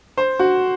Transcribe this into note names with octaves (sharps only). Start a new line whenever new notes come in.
C5
F#4